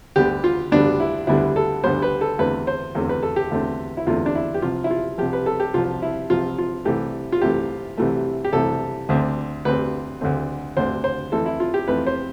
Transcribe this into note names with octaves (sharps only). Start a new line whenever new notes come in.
D2 D3 G3 B3 G4
F4
D2 D3 G3 B3 D4
E4
D2 D3 G3 B3 E4
A4
D2 D3 G3 B3 C5
B4
A4
E2 D3 A3 C4 B4
C5
E2 D3 A3 C4
B4
A4
G4
E2 D3 A3 C4
E4
E2 D3 A3 C4 F4
D4
E4
G4
C2 C3 F3 F4
E4
F4
C2 C3 F3 G4
B4
A4
G4
C2 C3 F3 F4
E4
C2 C3 F3 F4
F4
C2 C3 E3 A3 G4
F4
C2 C3 E3 A3 G4
C2 C3 E3 A3
G4
C2 C3 E3 A3 A4
D2 D3 A3 C4
D2 D3 A3 C4 B4
D2 D3 A3 C4
D2 D3 A3 C4 C5
C5
F2 E3 A3 C4 A4
E4
F4
G4
F2 E3 A3 C4 B4
C5